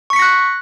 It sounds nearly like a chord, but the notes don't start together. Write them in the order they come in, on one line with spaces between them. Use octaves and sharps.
C#6 B6 C#7 A#6 F#6